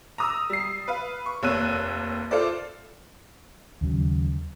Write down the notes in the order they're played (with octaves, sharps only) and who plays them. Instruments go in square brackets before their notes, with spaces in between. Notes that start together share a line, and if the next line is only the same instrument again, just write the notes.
[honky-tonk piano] A#5 D#6 E6
G3 C7
B4 F5
C#6
F1 D#2 C#5 E6 F#6 D#7
F4 A4 C5 D5
[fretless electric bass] D#2 C#3 F#3